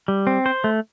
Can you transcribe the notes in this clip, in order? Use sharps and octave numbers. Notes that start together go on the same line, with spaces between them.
G3
C4
C5
A3